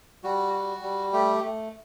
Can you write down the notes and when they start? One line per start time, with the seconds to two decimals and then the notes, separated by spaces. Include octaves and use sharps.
0.24 G3 F#4
0.53 F#4
0.83 G3
1.13 A3 G4
1.43 A3